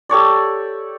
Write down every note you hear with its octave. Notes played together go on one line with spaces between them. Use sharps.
G4 A4 C#5 D5